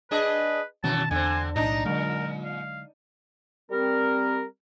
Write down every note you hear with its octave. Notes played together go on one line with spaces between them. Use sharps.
D4 G#4 B4 D#5
F#2 B2 D#3 E3 F#3 C#4 A5
E2 D3 C4 G#5
B1 A2 D4 D#4 A#5
A#2 D3 F#3 G#3 A#4
F5
G3 C4 A#4